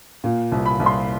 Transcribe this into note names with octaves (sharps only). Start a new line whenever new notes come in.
A#2
C2
B5
C2
C6